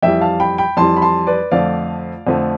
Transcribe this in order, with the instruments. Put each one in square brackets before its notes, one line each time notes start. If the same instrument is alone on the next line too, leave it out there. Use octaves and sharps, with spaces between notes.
[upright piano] F2 E3 G3 E5 G5
F5 A5
G5 B5
G5 B5
F2 E3 G3 A5 C6
B5
A5 C6
B4 D5
F2 D3 F3 A3 D5 F5
F2 D3 F3 A3